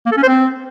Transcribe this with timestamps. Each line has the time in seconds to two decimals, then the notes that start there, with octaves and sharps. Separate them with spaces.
0.06 A#3
0.11 A4
0.17 C#4
0.23 C5
0.28 C4